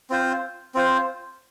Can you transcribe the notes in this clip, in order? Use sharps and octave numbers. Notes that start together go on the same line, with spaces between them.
C4 F4 C5
C4 F4 C5